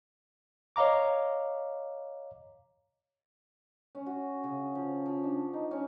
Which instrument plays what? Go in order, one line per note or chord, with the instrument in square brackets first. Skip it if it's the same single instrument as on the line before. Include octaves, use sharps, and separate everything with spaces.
[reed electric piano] C#5 D#5 F5 A#5 D6
[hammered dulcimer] C#4
F#4
C#3
F3
F3
D4
D#4
C#4